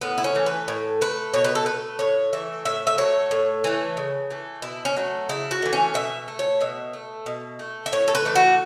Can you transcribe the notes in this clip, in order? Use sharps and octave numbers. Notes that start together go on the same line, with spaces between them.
A2 B3
E4
C#4
E3 A3
B4
A2
A3 B4
B2 C#5
B4
A4
A3 B4
A2 C#5
E3 A3 E5
A2 E5
E5
F#3 A3 C#5
A2
E3 A3
C#3
E3 A3
B2 E4
C#4
F#3 A3
C#3 E4
F#4
E3 A3
C#4
B2 E5
A3
C#5
B2 E5
A3
B2
A3
E5
A2 C#5
A4
B4
E3 A3
F#4